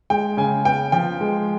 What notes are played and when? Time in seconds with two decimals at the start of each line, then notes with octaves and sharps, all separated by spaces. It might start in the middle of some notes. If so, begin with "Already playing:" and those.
0.10 G#3 G5
0.37 C#3 G#5
0.65 B3 G5
0.92 F3 G5
1.21 G#3